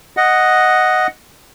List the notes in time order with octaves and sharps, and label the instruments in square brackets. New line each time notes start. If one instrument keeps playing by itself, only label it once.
[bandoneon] D#5 F#5